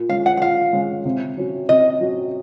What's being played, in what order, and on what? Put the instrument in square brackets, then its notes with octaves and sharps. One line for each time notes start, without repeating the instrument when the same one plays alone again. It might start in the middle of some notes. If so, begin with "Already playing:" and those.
Already playing: [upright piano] A#2
[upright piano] G#3 C#4 [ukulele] F5
[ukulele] F#5
F#5
[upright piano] A#2 [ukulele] F5
[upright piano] G#3 C#4
C3
F#3 C#4 F#4
[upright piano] C3 [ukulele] D#5
[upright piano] F#3 C#4 F#4